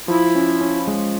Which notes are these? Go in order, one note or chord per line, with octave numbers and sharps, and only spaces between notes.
F3 E4
C#4
C#4
G#3